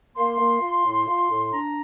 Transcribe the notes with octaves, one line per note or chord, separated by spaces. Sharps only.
A#3 C6
A#3
F4
A2
F4
A2
D4 A#5